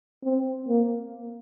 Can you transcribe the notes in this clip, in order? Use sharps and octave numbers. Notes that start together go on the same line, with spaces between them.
C4
A#3